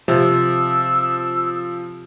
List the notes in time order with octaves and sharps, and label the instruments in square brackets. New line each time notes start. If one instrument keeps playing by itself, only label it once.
[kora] C3 [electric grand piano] F3 [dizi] E6